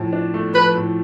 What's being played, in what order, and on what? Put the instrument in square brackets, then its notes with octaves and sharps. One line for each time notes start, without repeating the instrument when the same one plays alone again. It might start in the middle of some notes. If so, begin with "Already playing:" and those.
Already playing: [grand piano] A2 F3
D4
A3
[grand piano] F3 [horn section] B4
[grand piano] A2